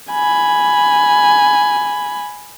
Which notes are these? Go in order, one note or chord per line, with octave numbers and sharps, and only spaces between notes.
G#5 B5